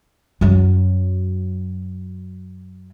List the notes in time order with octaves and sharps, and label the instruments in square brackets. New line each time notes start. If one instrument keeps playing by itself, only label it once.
[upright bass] F#2 F#3